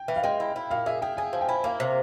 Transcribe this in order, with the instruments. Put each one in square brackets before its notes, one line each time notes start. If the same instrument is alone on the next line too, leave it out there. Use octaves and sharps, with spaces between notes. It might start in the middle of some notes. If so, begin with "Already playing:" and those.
Already playing: [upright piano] G5
[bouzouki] E3
[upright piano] F5
[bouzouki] G#3 [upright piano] G5
[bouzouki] E4
E4
[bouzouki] A#2 [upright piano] F5
[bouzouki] G#4 [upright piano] E5
[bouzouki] G#4 [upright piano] G5
[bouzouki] G#4 [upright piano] G#5
[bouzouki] F3
[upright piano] G5
[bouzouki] E4
[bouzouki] A#3 [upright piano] F5
[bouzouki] C3